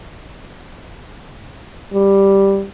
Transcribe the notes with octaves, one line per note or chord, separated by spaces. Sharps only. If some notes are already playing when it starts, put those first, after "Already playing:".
G3